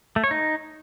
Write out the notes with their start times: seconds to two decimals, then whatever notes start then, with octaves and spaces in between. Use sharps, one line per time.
0.16 A3
0.24 C#5
0.31 D#4